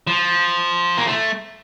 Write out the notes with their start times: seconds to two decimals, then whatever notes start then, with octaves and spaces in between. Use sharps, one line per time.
0.07 F3
0.97 A#3
1.07 A3